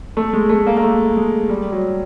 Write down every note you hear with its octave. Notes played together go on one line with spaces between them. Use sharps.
A3
G#3
A3
A#3
A#3
A3
G#3
G3
F#3